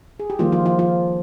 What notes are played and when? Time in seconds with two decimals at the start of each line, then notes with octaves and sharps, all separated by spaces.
0.20 G#4
0.30 G4
0.39 D#3 F3 G3 A#3 F4
0.52 F3 F4
0.66 F3 F4
0.79 F3 F4